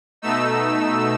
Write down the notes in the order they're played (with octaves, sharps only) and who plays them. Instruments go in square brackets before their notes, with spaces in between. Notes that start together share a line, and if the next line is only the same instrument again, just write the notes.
[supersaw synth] B2 A3 D#4 E6